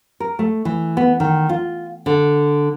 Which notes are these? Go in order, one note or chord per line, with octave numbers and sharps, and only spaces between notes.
A#4
A3
E3
B3
D#3
F4
D3